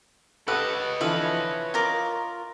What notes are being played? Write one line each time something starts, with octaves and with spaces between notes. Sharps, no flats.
G4 A4 B4 C#5 D#5 F#5
D3 E3 F3 B4 E5
F4 A#4 D6